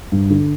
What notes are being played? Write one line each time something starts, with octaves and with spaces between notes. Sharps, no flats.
G2
D3